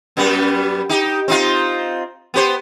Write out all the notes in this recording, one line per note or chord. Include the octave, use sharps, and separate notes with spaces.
F#2 G3 B3
D#4 G4
C4 D#4 F4
B3 G4 C5